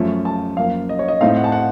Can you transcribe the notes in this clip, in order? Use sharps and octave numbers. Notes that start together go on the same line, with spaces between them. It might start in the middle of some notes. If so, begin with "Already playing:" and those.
Already playing: F#2 F3 A3 C#4
A5
F#2 F3 A#3 F5
D#5
C#5
D#5
A2 A3 C4 D#4 F5
F#5
A5
F#5